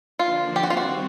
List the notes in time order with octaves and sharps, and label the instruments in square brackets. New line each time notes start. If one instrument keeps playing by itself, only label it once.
[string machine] D3 F3 A#3 D4 [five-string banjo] F4
[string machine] D#3 G3 C4 [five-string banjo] G4
[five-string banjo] F#4
F4
F#4